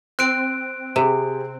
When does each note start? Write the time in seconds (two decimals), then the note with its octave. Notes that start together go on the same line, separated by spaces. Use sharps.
0.19 C4 F#6 D7
0.96 C3 G4 G#4